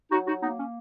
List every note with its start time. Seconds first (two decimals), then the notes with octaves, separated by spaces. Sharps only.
0.11 F#3 D#4 F#4
0.27 D#4 F#4
0.42 A#3 B3 D#4
0.58 C#4